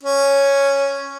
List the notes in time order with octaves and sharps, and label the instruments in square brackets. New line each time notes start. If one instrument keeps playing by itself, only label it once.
[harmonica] C#4